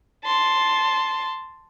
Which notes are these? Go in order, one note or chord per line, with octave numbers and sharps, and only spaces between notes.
A5 C6